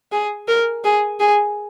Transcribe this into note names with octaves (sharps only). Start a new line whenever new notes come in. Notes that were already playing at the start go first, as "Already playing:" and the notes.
G#4
A#4
G#4
G#4